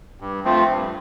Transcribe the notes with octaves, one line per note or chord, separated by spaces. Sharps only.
G2
F3 A3 C4 F4
G2